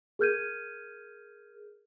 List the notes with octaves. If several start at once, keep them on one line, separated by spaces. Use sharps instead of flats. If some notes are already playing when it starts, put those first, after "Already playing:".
G#4 A#4 F6 G6 G#6 D#7